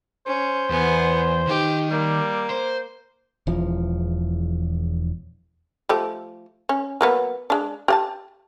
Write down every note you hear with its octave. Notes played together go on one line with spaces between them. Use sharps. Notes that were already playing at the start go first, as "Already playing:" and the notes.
C#4 C5
E2 B3 G#5
D#3 D#4 G4
G3 A#3
C5
E1 E2 F3
F3 A3 G4
C#4
F#3 A#3 B3
G#3 D4
G4 F#5 A5